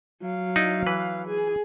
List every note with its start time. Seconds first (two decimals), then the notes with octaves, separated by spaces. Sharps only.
0.22 F#3 F5
0.56 D#4 E4 D5
0.87 E3 B4
1.28 G#4